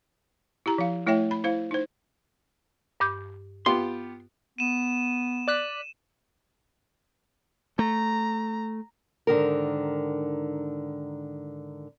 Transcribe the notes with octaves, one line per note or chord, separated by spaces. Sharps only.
E4 G4 A#5
F3 F5
A3 E4 C#5 E5 G5
B5
E4 C5 F5
D#4 C5
G2 D6 G6
B3 F4 G4 C6
B3 D#7 E7
D5 F#6 B6
A3 A#5
G#2 D3 D#3 A#4